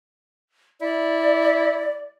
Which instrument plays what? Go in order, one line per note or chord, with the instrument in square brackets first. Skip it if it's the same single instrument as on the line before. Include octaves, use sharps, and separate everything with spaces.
[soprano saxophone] E4 [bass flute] D5